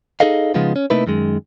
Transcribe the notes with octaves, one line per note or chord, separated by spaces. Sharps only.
D#4 G#4 A4 D#5 F5
C#3 F3 G#3 B3 D#4 F4
C#4
C3 A3 A#3 D#4 E4 B4
F#2 D#3 G#3